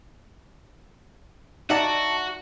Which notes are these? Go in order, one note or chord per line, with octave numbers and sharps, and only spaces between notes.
D#4 F#4 D5 E5 F#5 A5